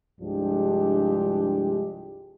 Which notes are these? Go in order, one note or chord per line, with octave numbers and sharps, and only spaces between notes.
C2 G2 F3 G#3 D4 G4